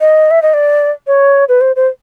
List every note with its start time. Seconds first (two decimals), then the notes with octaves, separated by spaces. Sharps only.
0.01 D#5
0.31 E5
0.42 D#5
0.54 D5
1.07 C#5
1.49 B4
1.61 C5
1.76 C5